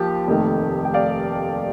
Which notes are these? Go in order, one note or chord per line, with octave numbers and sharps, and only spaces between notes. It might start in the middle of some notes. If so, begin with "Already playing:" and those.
Already playing: D#2 F3 G4
F1 D#2 D#3 A3
G5
D5 F5